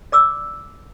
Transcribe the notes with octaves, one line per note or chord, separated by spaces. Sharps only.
D5 D6 E6